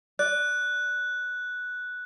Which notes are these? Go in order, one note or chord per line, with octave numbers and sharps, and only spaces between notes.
D5 F#6